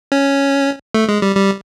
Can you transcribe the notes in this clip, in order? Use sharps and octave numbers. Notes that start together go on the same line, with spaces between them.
C#4
A3
G#3
G3
G3